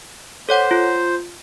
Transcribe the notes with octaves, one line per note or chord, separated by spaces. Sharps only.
A4 C5 C#5 F#5
F4